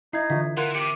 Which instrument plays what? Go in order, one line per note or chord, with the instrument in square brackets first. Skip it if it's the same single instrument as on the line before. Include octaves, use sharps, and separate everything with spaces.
[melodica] D#4 [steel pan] E4 [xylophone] G#6 C7
[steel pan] D3 E3 F4 [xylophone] E5
[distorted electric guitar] E3 [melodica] F4 F#5 [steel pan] A#4
[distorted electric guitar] C3 [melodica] G4 [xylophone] D6 C#7